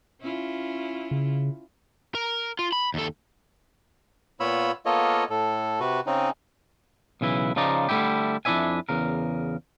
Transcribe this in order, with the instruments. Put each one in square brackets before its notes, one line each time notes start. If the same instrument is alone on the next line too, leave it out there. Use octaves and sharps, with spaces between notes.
[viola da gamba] C#4 E4 F4
[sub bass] C#3
[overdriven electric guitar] A#4
F4
B5
D#2 A4
[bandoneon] A#2 B3 F4 C#5 B5 E6
A#3 B3 F4 A4 C#5 D#5
A2 A4
C3 F#4 B4
C#3 C4 C#4 D#4
[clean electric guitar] B1 C#3 E3 E4
C#3 F3 D#4 D5 A#5
D3 G3 A3 D#4 E4 G4
F2 D4 E4 D5 E5 G#5
E2 C#3 A#4